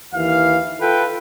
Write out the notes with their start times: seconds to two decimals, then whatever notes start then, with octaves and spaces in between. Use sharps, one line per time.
0.14 D#2 E3 F5
0.81 F4 A4 B4 G5